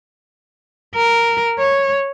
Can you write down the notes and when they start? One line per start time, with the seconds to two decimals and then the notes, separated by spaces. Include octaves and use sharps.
0.95 A#4
1.59 C#5